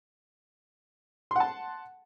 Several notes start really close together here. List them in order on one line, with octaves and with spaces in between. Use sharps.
C6 F#5 A5